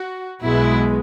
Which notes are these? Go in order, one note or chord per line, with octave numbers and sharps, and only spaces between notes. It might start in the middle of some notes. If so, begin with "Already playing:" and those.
Already playing: F#4
B1 B2 G#3 B3 E4